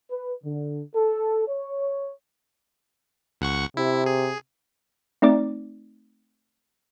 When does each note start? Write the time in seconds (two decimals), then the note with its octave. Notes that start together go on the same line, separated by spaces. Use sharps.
0.11 B4
0.44 D3
0.95 A4
1.47 C#5
3.41 C#2 F#5 C#6
3.77 C3 E4
4.06 G#4
5.22 A3 C4 D#4 D5 D6